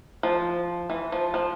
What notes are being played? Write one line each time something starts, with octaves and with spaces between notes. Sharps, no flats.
F3
E3
F3
F3